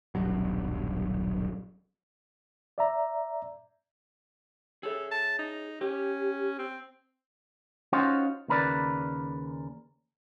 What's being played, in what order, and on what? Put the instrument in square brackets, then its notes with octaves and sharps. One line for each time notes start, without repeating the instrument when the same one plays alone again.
[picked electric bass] D#1 B1 G2 F#3
[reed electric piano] D5 E5 A#5
[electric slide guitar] G#4 C#5 E5 [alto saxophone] A4
[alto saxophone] A5
D#4
[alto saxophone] C#4 [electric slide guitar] G4
[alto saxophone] C4
[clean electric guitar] C#4 D#4 F4 F#4 C5 F5
D#2 C#3 A#4 B4 D5